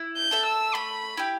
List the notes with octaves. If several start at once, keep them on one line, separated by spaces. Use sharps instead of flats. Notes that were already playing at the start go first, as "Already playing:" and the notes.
Already playing: E4
G6
A4 E5 A5
E6
A3 B5
E4 G4